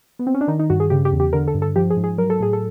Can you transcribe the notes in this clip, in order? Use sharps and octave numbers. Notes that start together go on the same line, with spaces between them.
B3
C4
C#4
D4
D#3 D#4
D#4
G2 F#4
G#4
C#3 G4
G4
E2
G4
D3 A#4
A4
G2
A4
F3 G4
G#4
G#2
G#4
F#3 A#4
A4
A2 G#4
A4